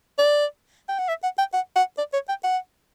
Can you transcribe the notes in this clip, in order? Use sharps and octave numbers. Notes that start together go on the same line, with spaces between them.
D5
G5
F#5
E5
F#5
G5
F#5
F#5
D5
C#5
G5
F#5